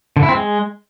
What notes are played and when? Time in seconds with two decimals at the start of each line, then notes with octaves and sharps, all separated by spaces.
0.17 D3
0.23 E4
0.29 C4
0.35 G#3